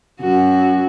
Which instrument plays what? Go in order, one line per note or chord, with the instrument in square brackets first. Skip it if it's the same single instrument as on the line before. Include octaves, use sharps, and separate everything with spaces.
[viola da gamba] F#2 F#4